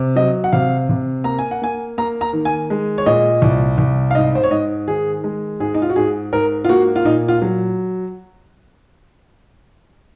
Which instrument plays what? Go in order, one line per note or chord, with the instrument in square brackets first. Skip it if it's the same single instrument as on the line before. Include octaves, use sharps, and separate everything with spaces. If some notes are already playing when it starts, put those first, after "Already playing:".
Already playing: [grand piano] C3
F#3 D#5
F#5
C3 F5
C3
A#3 A#5
G#5
F#5
A#3 G#5
A#3 A#5
A#5
D#3
G#5
G#3
C#5
A#2 D#5
C2
C2
F5
G#2 D#5
C5
C#5
G#2 D#5
D#3 G#4
G#3
G#2 G#4
D#4
F4
F#4
G#2 G#4
G#2 A#4
F4
A#3 F#4
F4
A#2 D#4
F4
F#3